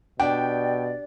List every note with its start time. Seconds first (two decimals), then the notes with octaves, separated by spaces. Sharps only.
0.20 B2 D4 G4 D5 G5